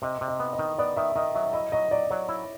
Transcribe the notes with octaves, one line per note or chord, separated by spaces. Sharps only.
C3 D#5
C3
D#5
B3
D#5
D#3
B3 D5
D#3 E5
D#3 D#5
F#3 E5
E4 D#5
F#3 D#5
F#3 D5
F#3 C#5
E4